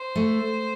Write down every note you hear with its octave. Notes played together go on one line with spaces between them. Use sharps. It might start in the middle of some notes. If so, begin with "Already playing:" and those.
Already playing: C5
A3